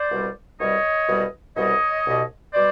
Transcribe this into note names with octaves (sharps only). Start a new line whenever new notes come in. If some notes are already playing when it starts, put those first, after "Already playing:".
Already playing: C5 D5
C2 B2 G3
C2 B2 G3 C#5 D#5
C2 B2 G3
C2 B2 G3 C#5 D#5
C2 B2 G3
B2 G3 C5 D5